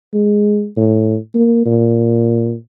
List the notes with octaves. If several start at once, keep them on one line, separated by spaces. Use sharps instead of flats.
G#3
A2
A#3
A#2